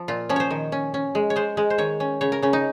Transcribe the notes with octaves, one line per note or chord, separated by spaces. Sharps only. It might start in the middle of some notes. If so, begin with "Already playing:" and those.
Already playing: F3
A#2 F4
F3 C#4
C5 C#5
D#3
C#4
C#4
G#3
C#5
G#3 C5
G#3
C5
D#3 C#5
C#4
C#3 C#5
A#4
C#3 C#4
D#4